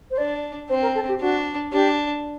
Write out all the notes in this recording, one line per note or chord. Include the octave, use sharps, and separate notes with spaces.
C5
D4 D5
C4 C5
A#4
A4
G4
D4 F#4
D4 G4